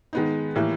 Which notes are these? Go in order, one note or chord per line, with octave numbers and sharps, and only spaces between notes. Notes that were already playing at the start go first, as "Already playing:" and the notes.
D#3 G#3 B3 D#4
A2 E3 G3 A#3